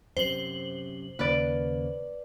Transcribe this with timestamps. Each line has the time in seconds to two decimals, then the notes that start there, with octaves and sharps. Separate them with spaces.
0.17 F#2 C3 C5 F#7
1.19 D#2 C#3 A#3 B4 D5